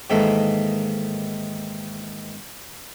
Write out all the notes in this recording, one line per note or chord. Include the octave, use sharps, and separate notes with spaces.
G#2 D#3 E3 A#3 A4 F5